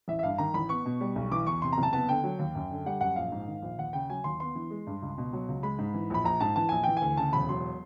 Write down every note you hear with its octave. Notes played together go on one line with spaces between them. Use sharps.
A1 E5
E5
G2 F5
D#3 A#5
A1 B5
B3 C#6
B2
G3
B1
E3 D6
E2 C#6
C3 C6
A#5
F#1 A5
B3 A5
D3 G5
F#3
D#2
F#2
D3
G3 F#5
F#2 F#5
A#1 F5
G#2
D#3
A#1
D#2 F#5
C#3 G5
F#3 G#5
D#2 C6
B3 C6
E3
G#3
G2
C#2
B2
F#3
C#2
G#3 B5
G#2
E3
A#1 B5
A#1 A#5
G#2 A5
E3 A5
A#1 G#5
E3 G5
D2 G#5
C#3 A5
E1 B5
F#3 C6